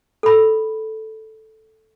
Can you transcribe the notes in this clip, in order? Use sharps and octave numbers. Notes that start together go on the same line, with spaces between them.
A4 B5